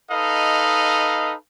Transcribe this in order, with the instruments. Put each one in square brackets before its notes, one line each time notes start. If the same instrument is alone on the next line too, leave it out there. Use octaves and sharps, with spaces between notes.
[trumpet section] D#4 A4 B4 D#5 F5